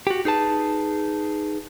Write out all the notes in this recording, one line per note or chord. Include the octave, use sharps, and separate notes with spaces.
F#4 G4
D#4 G#4 B4 A5